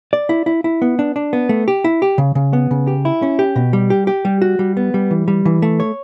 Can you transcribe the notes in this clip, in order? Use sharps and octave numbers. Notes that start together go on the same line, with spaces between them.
D5
E4
E4
E4
B3
D4
D4
B3
A3
G4
E4
G4
C#3
C#3
B3
C#3
G4
E4
C#4
G4
B2
G3
G4
G4
G3
F#4
G3
B3
G3
E3
G3
E3
A3
C#5